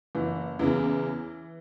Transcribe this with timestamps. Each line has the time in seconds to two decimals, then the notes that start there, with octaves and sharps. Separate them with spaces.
0.15 F#1 E3
0.59 E2 C#3 E3